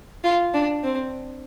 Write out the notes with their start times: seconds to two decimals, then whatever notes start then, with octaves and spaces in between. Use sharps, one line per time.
0.24 F4
0.54 D4
0.83 C4